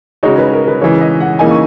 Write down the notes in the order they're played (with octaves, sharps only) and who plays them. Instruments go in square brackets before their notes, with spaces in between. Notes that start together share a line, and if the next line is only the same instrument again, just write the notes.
[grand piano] C#3 G#3 D#4 F#4 [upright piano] C#5
[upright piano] B4
A#4
B4
[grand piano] C#3 E3 G#3 [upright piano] C#5
[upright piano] D#5
F#5
[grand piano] C#3 E3 A#3 D#4 [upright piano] G#5
[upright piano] C#6